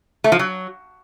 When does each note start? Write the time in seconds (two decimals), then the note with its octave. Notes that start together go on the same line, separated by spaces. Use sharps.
0.24 A3
0.32 F3
0.39 F#3